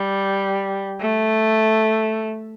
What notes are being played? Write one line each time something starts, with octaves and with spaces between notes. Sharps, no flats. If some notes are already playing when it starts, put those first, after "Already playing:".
Already playing: G3
A3